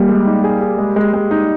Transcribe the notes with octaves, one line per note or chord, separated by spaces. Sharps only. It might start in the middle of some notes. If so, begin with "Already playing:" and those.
Already playing: G3 A#3
G#3
D#4
G#4
G#4
G#3
G#3
G#3
D#4